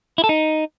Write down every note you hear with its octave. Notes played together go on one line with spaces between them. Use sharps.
E4
A4
D#4